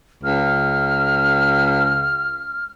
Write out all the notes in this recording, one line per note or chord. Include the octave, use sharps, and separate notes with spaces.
C#2 F6